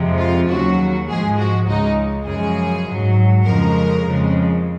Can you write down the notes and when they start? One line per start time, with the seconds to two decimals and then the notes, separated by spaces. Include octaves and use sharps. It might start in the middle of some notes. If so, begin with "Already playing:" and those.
Already playing: F2 C3 F3 G#3
0.18 F4
0.48 D#2 C#3 F#3 F#4
1.07 G#2 F3 G#3 G#4
1.38 F#4
1.66 C#2 C#3 G#3 D#4
2.26 F#2 C#3 F3 G#3 G#4
2.86 G#2 F#3
3.45 F2 C#3 F3 G#3 A#4
4.05 F2 C#3 F3 G#3